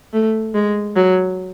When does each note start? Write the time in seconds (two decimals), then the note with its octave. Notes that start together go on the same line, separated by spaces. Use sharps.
0.13 A3
0.54 G#3
0.95 F#3